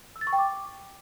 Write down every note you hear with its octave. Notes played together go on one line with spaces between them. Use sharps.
E6
A6
C#6
G5
D6